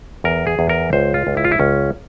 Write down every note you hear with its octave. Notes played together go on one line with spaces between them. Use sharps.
E2 A#4
G#4
E2
A#4
C#2 C5
F4
C#2
E4
F4
E4
C#2 C#4